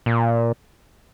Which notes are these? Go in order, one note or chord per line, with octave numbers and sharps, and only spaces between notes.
A#2